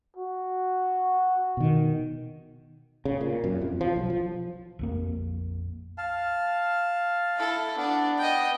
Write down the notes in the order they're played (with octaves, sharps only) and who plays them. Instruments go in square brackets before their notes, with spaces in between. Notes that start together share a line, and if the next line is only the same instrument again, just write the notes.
[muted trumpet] F#4
[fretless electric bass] B2 D#3
C#3
A#2
F#2
F2
F3
B1
F3
[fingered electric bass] A#1 F2 A#3
[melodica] F5 A5
[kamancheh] E4 A4
[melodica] B3 [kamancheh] D4
[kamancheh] D#5 G5